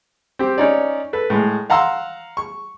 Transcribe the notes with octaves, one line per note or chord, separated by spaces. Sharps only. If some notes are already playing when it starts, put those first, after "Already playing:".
C4 G4
C#4 D#4 D5
A4 B4
A2 G#3
F5 F#5 A#5 C6 E6
C#6